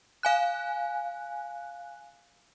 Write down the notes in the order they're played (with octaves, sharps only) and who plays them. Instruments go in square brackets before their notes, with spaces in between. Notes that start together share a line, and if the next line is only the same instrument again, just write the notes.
[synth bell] F5 G#5 F#6